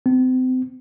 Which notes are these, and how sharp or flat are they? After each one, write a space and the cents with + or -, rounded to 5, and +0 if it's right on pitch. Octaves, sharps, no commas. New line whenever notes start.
C4 -35